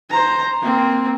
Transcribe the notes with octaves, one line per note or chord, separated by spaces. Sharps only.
C5 A#5
A#3 C4